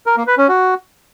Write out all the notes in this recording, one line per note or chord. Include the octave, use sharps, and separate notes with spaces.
A#4
A#3
B4
C#4
F#4